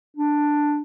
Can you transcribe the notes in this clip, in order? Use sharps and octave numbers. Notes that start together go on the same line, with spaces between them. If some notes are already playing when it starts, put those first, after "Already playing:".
D4